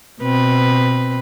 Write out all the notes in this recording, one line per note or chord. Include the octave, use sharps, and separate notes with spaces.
B2 C4 B4